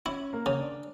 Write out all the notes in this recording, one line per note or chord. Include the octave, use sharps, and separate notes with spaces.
C#4 E4 C#5
A#3 A#4
C#3
D4 D5